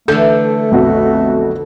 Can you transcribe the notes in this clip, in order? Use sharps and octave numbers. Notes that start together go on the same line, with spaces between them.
D3 E3 A3 A4 G6
B1 F2 F#4